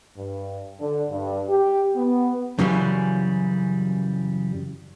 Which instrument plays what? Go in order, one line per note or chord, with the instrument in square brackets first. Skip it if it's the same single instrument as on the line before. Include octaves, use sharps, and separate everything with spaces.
[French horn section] G2
D3
G2
G4
B3
[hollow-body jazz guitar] F#2 C#3 E3 F#3 G3